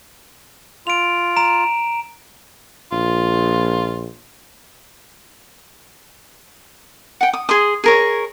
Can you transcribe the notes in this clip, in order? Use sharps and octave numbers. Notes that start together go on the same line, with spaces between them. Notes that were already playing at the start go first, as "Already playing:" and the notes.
F4 D7 F7
A#5 D7 E7
A#1 F4
F#5 G5
D#6
G#4 C6 D#6
G#4 A#4 C#5